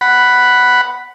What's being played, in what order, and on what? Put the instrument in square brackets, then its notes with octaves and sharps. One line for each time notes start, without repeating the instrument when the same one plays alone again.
[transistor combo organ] F#5 B5